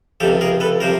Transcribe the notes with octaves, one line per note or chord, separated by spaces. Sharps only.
C#2 C3 F3 G4 A4
G#4 A#4
A4 B4
C3 F3 A#4 C5